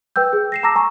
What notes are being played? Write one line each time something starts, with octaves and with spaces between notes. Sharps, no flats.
B4 G5 E6 G6
G#4
A#6 C7 E7
A5 A#5 D6 E6 A#6
G#5 A#5 C#6